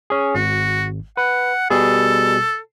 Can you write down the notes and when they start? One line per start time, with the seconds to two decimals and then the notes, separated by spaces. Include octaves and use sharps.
0.10 C#4 G#4
0.35 G#1 F#4
1.17 B4 F#5
1.70 B2 G3 G#4 A4